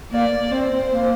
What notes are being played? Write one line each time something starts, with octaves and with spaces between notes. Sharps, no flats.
A#3 D5
C4 C5
A#3